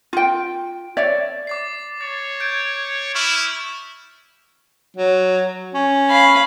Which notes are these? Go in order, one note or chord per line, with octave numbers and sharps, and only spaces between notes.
F4 G5
C#5 D5 E5
D6 A6 C7
C#5 A6
G6 G#6 D7
E4 C#6 F6 F7
F#3
C#4
F5 B5